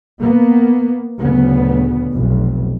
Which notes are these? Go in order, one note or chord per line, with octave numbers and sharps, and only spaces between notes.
A#3 B3
D2 A#2 C#3 F#3 B3
F1 B1